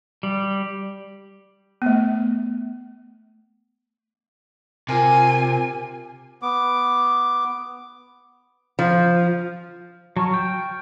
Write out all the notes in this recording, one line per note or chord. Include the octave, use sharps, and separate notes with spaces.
G3
A3 B3
C3 F4 A#4 G#5
B3 D6
F3
F#3 A5 C#6 F6
G5